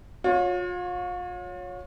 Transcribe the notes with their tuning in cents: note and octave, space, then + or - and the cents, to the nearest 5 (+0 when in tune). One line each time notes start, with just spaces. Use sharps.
F4 +40 C#5 +0